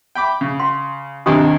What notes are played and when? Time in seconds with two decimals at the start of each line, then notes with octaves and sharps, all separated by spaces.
0.15 G5 B5 D6
0.41 C#3
0.59 F5 C6
1.26 G#1 D#2 C3 D4 G4 D#6